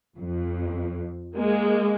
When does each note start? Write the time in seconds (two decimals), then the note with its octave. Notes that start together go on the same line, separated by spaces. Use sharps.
0.18 F2
1.37 G#3 A#3